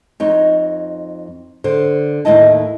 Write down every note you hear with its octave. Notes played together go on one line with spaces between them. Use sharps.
F2 D#4 C#5
D3 C5
D#2 A2 F3 E4 D#5 A5